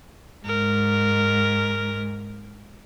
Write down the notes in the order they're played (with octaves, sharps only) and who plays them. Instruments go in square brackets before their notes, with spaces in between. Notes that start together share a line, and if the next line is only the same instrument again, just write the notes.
[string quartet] G#2 [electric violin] A#4